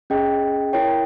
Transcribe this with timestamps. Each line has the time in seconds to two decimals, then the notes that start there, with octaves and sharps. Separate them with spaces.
0.10 C#4 G#4 D#5 G5
0.73 E4 A#4 C#5 G5